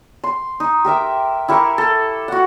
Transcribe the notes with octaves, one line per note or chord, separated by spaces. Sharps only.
C6
D#4
G4 A#4 E5 G5
E4 G4 A#4 C#6
A4
F#4 F#5